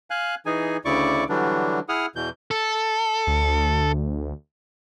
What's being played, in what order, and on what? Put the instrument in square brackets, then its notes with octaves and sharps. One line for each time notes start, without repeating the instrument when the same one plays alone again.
[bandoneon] F5 G#5 F#6
E3 D#4 G#4 G#5
D2 C#3 E4 D5 C#6 D6
D3 E3 F#3 G3 D4
E4 G#4 F#5 D#6 F6
E2 B2 E3 G6
[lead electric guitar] A4
[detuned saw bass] D2